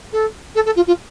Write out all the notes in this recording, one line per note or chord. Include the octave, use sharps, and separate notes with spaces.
A4
A4
A4
F4
F4